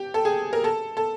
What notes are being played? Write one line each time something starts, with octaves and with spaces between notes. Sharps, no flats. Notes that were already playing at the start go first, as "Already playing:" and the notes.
Already playing: G4
A4
G#4
A#4
A4
A4